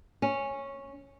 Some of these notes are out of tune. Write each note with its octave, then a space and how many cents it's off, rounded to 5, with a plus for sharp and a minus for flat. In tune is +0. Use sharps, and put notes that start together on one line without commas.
C#4 -10